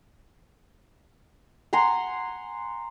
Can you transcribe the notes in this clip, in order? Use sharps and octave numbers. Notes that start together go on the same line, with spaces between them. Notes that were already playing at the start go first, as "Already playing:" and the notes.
F#5 G#5 A#5 C6